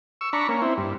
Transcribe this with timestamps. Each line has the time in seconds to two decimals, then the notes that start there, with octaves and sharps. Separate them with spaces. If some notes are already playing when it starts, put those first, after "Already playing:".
0.21 C#6 E6
0.33 D4 A#5 B5 C#6
0.49 A#3 C#4
0.62 C4 E4
0.78 G2